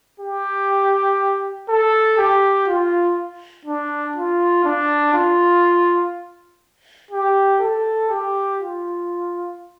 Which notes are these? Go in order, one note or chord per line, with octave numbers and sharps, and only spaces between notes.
G4
A4
G4
F4
D4
F4
D4
F4
G4
A4
G4
F4